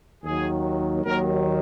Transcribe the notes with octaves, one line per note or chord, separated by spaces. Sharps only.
D#2 D#3 F#3 G#4
D#2 D#3 F#3 A#4